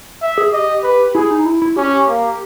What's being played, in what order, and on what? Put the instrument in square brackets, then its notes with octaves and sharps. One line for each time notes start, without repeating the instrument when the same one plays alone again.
[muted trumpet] E5
[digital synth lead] G#4
[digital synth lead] G4 [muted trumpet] D#5
[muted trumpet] B4
[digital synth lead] E4 [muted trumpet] G#4
[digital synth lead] D#4
E4
E4
[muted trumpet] C#4 [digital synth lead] G4
[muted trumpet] A#3